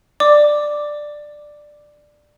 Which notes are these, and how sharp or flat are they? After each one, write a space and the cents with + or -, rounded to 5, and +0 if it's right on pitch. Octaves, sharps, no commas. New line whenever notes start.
D5 +10 D6 +0